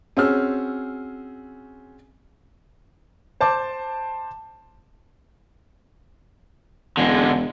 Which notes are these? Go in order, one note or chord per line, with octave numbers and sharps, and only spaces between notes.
C4 C#4 F#4 G#4 E6 F6
C5 A5 D6
E1 D3 G#3